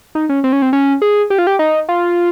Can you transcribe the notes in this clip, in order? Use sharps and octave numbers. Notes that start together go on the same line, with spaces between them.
D#4
C#4
C4
C#4
C4
C#4
G#4
G4
F4
G4
D#4
F4